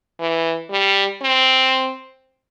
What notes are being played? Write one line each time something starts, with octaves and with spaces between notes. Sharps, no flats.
E3
G3
C4